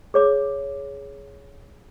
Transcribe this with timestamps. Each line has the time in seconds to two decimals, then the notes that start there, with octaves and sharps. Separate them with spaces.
0.14 G#4 C#5 D6